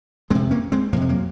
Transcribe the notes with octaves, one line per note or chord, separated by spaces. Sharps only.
F2 C3 G#3 C4
A#3 C#4
G#3 C4
F2 C3 A#3
G#3
F#3 A#3